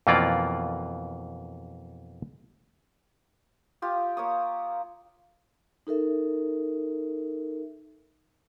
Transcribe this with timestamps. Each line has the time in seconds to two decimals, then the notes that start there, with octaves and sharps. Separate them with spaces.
0.07 F2 B2 E3 A#3 F4 D5
3.82 F4 G4 D#6
4.17 A#3 C#5 D#6
5.87 D#4 A4 A#4 E5